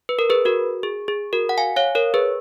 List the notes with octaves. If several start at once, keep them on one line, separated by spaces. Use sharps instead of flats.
B4
A#4
G#4 B4
F#4 A#4
G#4
G#4
F#4 A#4
F#5
F5 G#5
C#5 F5
A#4 C#5
G#4 B4